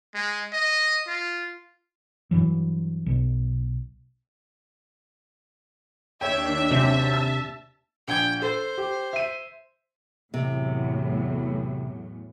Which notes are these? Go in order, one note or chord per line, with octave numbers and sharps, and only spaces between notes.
G#3
D#5
F4
G2 E3 F#3
B1
D#2 D4 C#5 E5 G5
C3 F#3 C4 C#4 A5
E6
A#1 G5 G#6
A4 C5
G4
E5 D#7
E2 A2 C3 F#3